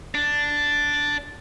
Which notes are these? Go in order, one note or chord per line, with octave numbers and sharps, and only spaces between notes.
D4